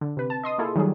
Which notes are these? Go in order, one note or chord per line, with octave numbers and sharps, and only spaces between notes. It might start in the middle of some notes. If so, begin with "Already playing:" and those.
D3
C3 B4
A5
D#5 C6 D#6
A#3 E4 F4 G#4 A4
D#3 F#3 G3 G#4